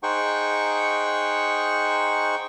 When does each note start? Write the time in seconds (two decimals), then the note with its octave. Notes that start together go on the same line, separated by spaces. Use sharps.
0.03 D#4 G#4 C5 F#5 G5 C#6